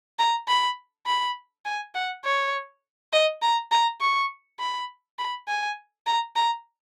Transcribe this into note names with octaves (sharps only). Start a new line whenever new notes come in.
A#5
B5
B5
G#5
F#5
C#5
D#5
A#5
A#5
C#6
B5
B5
G#5
A#5
A#5